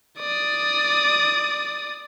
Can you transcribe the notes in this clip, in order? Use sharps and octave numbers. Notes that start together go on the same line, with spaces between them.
D5 D#6